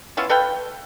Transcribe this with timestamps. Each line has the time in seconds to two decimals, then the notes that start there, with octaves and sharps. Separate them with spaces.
0.17 B3 C#4 E4 F4
0.30 A4 B4 F5 G5